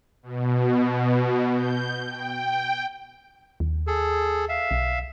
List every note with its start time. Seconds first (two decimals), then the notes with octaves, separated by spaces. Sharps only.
0.23 B2
1.54 G6
2.07 G5
3.60 D#2
3.87 G#4 A4
4.49 E5 F5
4.71 B1